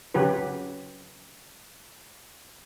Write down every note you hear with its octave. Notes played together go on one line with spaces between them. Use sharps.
C#3 F#3 F#4 G4 B4